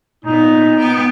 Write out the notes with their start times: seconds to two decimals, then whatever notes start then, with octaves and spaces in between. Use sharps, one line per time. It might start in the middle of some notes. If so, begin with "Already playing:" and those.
0.24 A#2 B3 D#4
0.78 B3 G5